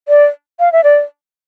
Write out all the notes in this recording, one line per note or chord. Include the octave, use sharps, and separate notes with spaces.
D5
F5
E5
D5